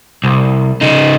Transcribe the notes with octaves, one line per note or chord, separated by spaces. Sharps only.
C2
C#3 D#4